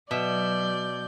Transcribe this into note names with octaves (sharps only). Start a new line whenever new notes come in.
B2 F#3 D5 E5 G6